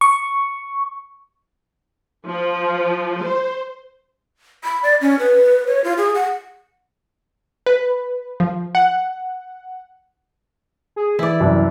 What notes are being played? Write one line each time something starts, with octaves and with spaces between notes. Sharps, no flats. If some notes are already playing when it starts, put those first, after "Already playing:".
C#6
F3
C5
B5
D5
C#4
B4
C#5
F4
G#4
F#5
B4
F3
F#5
G#4
E3 E4 D5
C2 F#2